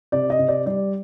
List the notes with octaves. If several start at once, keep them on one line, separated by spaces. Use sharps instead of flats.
C3 D5
D#5
C3
D5
G3 D5